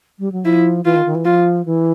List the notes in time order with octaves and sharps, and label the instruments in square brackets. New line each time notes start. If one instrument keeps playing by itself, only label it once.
[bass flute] G3
F#3
[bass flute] F3 [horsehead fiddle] E4
[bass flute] E3 [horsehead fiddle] F4
[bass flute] D#3
D#3
E3
[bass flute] F3 [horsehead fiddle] F4
[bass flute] E3